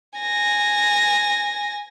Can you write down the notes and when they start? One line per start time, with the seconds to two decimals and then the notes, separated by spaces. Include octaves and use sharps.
0.19 G#5 A#6